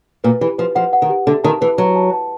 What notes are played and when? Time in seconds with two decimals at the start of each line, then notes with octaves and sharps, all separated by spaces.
0.24 A#2 B4
0.41 E3 G4
0.59 F3 B4
0.75 F3 F#5
0.93 F#5
1.02 D#3
1.10 G4
1.27 D3 E5
1.44 D#3 A5
1.61 E3 B4
1.78 F#3 B4
1.96 A5
2.13 A5